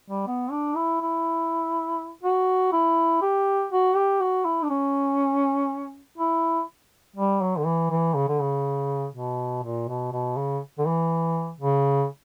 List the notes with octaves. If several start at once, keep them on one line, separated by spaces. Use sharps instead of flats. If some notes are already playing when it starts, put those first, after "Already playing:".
G3
B3
D4
E4
E4
F#4
E4
G4
F#4
G4
F#4
E4
D4
C#4
E4
G3
F#3
D3
E3
E3
C#3
D3
C#3
B2
A#2
B2
B2
C#3
D3
E3
C#3